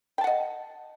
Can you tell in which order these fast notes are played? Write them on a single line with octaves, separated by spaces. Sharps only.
G5 A5 F#5 D#5